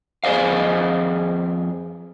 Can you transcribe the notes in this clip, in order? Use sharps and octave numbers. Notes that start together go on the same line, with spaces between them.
F2 G#4 C5 D#5 F5